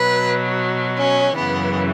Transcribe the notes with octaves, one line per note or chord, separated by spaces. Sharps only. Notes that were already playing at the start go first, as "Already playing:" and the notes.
Already playing: B2 F#3 B4
C#4
F#2 C#3 E3 B3